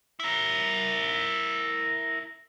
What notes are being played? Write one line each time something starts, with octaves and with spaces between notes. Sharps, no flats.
E4 A#4